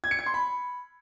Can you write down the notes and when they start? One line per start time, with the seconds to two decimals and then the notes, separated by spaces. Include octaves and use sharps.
0.04 G#6
0.11 C#7
0.19 G#6
0.26 C6
0.34 B5